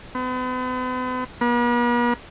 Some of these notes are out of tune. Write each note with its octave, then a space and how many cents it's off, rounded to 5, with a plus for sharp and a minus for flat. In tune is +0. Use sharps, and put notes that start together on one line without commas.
B3 +45
B3 -45